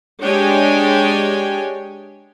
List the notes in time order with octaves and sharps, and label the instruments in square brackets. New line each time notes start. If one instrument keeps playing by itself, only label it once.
[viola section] G#3 D4 G4 C#5 G5 G#5